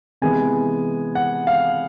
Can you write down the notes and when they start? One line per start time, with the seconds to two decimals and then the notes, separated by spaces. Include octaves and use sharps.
0.22 C3 E3 G#3 B3 G#5
1.15 F#5
1.47 F5